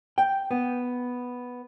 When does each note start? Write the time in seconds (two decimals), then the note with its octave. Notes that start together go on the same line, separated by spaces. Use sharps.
0.18 G5
0.51 B3